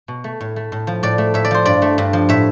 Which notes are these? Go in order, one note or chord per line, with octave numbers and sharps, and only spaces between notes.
B2
A3
A2
A3
A2
F3
A2 D5
A3
A2 E5
D5
F3 C5
G2 D5
A3
G2
F3
A2 E5